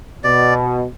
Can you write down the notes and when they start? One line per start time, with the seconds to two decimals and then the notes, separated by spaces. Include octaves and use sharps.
0.24 B2 D5